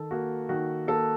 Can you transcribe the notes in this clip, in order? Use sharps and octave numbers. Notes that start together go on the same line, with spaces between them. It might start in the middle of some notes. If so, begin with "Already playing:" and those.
Already playing: D#3 A4
A#3 F#4
D#3 F#4
A#3 A4